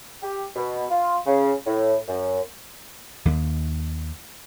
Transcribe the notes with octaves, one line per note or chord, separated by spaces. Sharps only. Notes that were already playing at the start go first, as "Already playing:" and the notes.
G4
B2
F4
C#3
A2
F#2
D#2 D#3